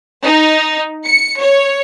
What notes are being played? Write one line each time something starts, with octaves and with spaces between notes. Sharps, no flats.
D#4
C#7
C#5